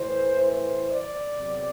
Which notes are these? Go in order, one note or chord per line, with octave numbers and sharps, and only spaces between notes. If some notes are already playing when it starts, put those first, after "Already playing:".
Already playing: A2 E3 C5
C5
D5
E2 C3 F#3